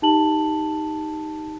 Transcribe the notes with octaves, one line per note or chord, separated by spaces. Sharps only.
D#4 G4 A5 F#7